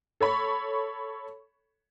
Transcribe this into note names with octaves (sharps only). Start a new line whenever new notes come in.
A4 C#5 B5 C#6